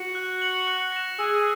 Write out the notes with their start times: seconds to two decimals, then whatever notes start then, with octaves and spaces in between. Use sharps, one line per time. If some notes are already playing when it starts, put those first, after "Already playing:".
Already playing: F#4
0.15 F#6
0.42 C#7 F#7
0.67 F#6
0.92 A#6 E7
1.18 G#4 E6